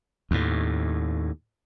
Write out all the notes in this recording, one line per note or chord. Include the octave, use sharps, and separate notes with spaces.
D#2 A2